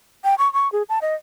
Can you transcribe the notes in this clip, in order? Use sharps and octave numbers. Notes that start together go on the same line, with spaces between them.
G5
C#6
C#6
G#4
A5
D#5